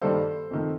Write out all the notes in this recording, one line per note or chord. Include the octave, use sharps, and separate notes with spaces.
G2 D#3 G3 A#3 A4 C5
F2 D#3 A3